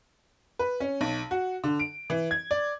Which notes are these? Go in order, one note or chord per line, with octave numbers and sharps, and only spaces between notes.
B4
C#4
B1
F#4
D3
D7
E3
G#6
D5